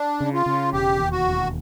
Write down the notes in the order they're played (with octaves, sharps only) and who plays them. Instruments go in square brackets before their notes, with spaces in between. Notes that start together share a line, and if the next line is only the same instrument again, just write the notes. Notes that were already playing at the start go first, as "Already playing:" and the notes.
Already playing: [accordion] D4
[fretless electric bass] C#3
[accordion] F4
[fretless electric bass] C#3
[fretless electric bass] E1 [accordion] G4
[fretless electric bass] D#2
[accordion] F#4
[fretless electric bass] E1